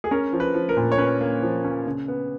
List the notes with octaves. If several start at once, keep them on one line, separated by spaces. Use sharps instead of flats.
G#4
C#4 A#4
F3
B4
F3
A#4
A#2
C#5
C#4 B4
A#3
F3
C#4
C#3
B3